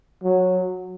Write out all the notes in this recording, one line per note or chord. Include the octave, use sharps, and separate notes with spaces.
F#3